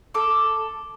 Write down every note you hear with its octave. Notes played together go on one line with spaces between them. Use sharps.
A4 D6